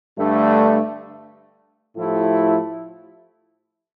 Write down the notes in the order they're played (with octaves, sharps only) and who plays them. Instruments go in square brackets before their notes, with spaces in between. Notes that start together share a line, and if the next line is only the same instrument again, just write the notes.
[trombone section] G2 D3 A3
A2 F3 A3 E4 G4